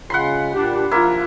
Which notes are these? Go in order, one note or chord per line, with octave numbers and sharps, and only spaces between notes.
C#3 G#3 F4 F#5 B5 C6
A#2 G3 D4 G4
F3 A#3 E4 F4